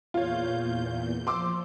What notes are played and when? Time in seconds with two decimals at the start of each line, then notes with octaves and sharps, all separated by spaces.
0.14 E2 A#2 F4 C#5 G6
1.27 F3 C6 D6 E6